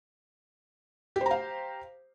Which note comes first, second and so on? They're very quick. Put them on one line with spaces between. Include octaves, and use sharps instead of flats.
G4 C5 A#5 F5